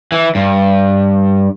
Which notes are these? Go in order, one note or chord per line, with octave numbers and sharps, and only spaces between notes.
E3
G2